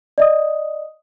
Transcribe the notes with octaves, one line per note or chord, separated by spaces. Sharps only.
D5 D#5 D#6